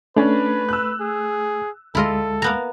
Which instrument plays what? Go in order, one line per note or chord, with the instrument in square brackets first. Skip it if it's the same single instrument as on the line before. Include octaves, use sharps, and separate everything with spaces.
[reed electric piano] A3 [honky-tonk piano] C#4 D4 [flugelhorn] B4
[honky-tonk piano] E6 F#6
[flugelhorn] G#4
[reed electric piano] D2 G#3 [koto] E4 F4 D#5 [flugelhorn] A4
[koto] A#3 B3 A#5